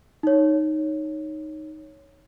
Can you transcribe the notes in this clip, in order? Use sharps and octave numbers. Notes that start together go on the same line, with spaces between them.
D#4 C#5